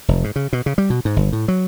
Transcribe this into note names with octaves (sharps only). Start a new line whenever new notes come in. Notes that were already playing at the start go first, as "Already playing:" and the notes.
F1
G#2
C#3
B2
C#3
G3
B2
G#2
G1
A2
F#3